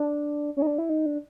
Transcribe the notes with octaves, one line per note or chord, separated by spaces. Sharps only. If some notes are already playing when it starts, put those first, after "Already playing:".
Already playing: D4
C#4
D#4
D4
E4
D#4
D4